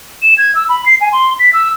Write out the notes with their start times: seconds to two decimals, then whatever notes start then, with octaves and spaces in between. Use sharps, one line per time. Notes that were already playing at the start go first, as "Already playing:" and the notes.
0.23 E7
0.38 G#6
0.55 E6
0.69 B5
0.86 C7
1.01 G#5
1.13 C6
1.40 B6
1.53 E6